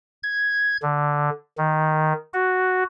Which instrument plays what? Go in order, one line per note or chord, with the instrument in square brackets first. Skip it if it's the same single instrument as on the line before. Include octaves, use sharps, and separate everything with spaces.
[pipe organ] G#6
D3
D#3
F#4